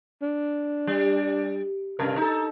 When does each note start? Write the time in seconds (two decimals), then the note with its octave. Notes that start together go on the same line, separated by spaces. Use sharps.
0.22 D4
0.87 G3
1.99 G2 C3 A#4
2.17 D#4 A4